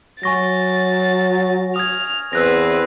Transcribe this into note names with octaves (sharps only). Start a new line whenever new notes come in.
F#3 G#5 C#6 A6 A#6
D#6 F6 G#6
E2 C4 B4 E6 F#6 A#6